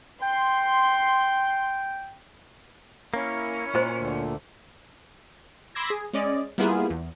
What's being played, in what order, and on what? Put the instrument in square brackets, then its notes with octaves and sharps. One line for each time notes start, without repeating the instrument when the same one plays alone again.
[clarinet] G5 [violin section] C6
[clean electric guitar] A#3 [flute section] C#4 [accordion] E4 A#4
[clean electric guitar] A#2 [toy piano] F#4 C5 D#5
[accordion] D2 D3 A3
[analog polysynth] B5 C6 D6 E6 G#6 A#6
G#4
G#3 C#4 D5 D#5
G3 A#3 B3 E4 F4 G#4
E2